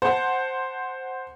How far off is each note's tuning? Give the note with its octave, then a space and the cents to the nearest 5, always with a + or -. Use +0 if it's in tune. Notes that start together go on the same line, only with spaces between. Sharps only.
C5 +0 F#5 +0 A5 +0